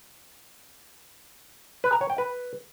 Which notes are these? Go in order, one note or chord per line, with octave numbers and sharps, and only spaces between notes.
B4
A#5
C#5
G5
B4